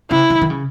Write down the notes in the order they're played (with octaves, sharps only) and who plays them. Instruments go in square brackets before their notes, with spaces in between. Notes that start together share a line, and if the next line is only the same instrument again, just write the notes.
[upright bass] C#3 [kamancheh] E4
[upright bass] D#3
D#3
C#3